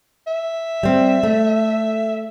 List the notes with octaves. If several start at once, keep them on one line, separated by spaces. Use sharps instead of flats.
E5
G3 C4
A3